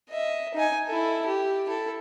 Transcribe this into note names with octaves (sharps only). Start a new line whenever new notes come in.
D#5 E5
D#4 G#5
E4 A4
G4
E4 A4